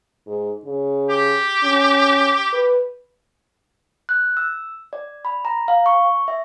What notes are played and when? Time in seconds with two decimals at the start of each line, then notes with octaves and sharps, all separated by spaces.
0.27 G#2
0.65 C#3
1.10 G4
1.63 C#4
2.53 B4
4.09 F#6
4.37 E6
4.93 D5
5.25 B5
5.45 A#5
5.68 F5
5.86 C#6
6.28 E5